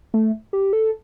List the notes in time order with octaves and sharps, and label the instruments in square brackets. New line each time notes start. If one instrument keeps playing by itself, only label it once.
[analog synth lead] A3
G4
A4